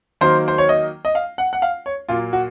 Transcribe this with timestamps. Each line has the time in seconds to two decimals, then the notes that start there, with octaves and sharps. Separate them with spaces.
0.21 D#3 F#3 A#3 C5
0.48 C5
0.58 C#5
0.69 D#5
1.05 D#5
1.15 F5
1.38 F#5
1.53 F#5
1.62 F5
1.86 C#5
2.09 A#2 F#3 A#3 F4
2.33 F#4